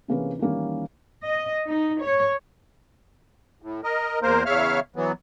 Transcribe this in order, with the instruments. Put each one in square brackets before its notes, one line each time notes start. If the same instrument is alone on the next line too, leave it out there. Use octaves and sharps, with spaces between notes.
[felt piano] C3 E3 A#3 C#4 G#4 B4
D#3 E3 G3 A#3 C#4
[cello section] D#5
D#4
C#5
[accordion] A2
A#4 D#5
E2 A#3 A#4 C5
E2 C#3 C#5 E5 F5 F6
E3 F#3 B3